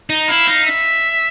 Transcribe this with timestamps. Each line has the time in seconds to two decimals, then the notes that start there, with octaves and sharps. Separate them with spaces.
0.10 D#4
0.28 E4 F5
0.47 D#4
0.66 E5